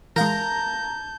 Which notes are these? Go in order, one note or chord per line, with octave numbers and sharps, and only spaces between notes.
E3 G#3 A#4 F5 A5 A#5 G6